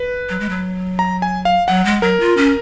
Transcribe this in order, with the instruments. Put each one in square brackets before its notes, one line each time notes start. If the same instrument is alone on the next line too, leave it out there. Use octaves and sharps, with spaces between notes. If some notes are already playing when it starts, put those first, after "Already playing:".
Already playing: [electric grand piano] B4
[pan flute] F#3
G#3
F#3
[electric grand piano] A#5
G#5
F5
[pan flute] F#3 [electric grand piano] F#5
[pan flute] G#3
[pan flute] F#3 [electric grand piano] A#4
[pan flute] F4
C#4